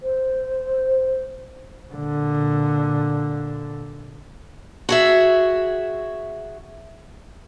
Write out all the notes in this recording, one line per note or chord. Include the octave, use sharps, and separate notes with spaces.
C5
A#2 D3
F#4 G#4 E5